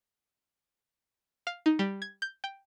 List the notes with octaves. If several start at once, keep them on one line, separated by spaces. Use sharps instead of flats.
F5
D#4
G3
G#6
G6
G5